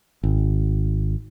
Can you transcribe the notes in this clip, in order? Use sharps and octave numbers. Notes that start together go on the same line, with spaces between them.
G#1